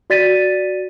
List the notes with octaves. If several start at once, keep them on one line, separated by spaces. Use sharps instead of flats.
F#4 D5 A6 B6 D#7